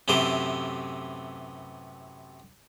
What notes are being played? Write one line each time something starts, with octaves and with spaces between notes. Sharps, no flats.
F#2 A2 C3 E3 G4 C5